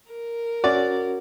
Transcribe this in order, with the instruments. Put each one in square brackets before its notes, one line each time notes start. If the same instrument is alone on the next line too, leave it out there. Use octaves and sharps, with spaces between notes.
[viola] A#4
[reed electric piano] C#4 F#4 [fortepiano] D5